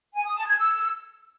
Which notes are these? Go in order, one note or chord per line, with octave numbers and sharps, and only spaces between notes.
G#5
D#6
A5
G#6
E6